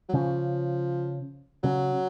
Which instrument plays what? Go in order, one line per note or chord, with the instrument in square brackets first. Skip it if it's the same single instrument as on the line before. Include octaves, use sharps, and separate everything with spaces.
[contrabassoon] F#3
[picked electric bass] C#3 C#4 [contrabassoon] F3
[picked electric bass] C#3 C#4 [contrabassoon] F#3